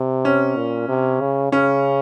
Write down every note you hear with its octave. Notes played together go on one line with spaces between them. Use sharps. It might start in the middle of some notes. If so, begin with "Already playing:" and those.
Already playing: C3
C#4
A#2
C3
C#3
C#3 C#4